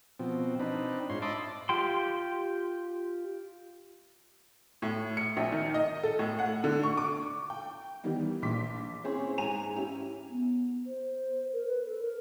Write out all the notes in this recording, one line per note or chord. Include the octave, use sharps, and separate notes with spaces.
B2 F3 C4
C4 D4 D#4 B4
G#2 F4 C#5 C6
D#5 E5 A5 B5 C6 D6
F4 G4 G5 C6
A2
C#7
A#1
D#3
D#5
A4
A2
F#5
D3
C#6
D6
G5
D#3 E3 G3 B3 D#4
A#1 A#2 C6 D6 B6
C4 C#4 E4 G#4 C5 C#5
G#2 G#4 G#5 A#5 D#7 F7
C#4 E4 G4
B3
C5
A#4
B4
A4
A#4